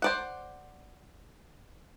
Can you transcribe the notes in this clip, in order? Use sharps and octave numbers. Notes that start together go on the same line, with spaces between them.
C5 D5 F#5